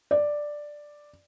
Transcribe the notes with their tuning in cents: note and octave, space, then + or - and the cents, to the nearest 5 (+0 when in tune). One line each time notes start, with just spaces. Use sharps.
D5 +5